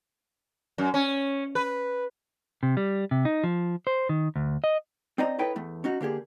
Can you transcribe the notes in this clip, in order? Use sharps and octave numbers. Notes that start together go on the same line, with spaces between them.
F#2
C#4
B4
C3
G3
C3
D#4
F3
C5
D#3
D2
D#5
C4 D#4 C5 D5 D#5 A#5
D#4 E4 A4 B4 C#5 G5
E2 A3
C#4 D#4 F#4
D3 A#3 G4 G#4